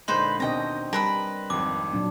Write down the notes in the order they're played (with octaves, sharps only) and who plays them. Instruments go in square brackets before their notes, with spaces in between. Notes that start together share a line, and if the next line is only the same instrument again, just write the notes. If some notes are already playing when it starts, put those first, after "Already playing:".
[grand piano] A#2 D3 G#3 [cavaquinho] D#4 B4 C5 [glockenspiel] C6
[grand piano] D#2 B2 A#6 [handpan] C4 D4 D#5 [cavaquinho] G5 A#5
[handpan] G3 [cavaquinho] A#4 B4 B5 [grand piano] A5
[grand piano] G#1 F2 [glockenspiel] D6
[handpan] A#2 F#3 D4